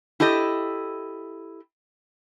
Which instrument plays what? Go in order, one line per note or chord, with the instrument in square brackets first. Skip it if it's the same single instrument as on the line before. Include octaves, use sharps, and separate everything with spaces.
[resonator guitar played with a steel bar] E4 G4 A4 D#5